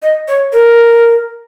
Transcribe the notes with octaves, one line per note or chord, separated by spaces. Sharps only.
D#5
C#5
A#4